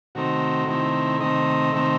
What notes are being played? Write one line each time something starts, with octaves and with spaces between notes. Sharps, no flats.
C3 D#3 A3 C4 D#4 F#4
C3 D#3 A3 C4 D#4 E4
C3 D#3 A3 C4 D#4 D#5
C3 D#3 A3 C4 D#4 E5